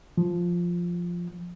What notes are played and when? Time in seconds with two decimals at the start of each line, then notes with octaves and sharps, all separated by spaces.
0.18 F3